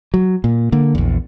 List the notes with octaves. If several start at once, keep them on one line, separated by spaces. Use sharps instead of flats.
F#3
A#2
D3 A#3
A#1 E2